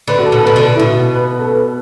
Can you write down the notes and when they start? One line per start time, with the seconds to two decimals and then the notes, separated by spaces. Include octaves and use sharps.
0.08 D3 B4
0.19 F#4
0.26 A4
0.32 B2
0.38 A4
0.44 B2 B4
0.56 D3
0.62 A4
0.76 E4
0.80 B2 F#4
1.15 B4
1.39 A4
1.51 B4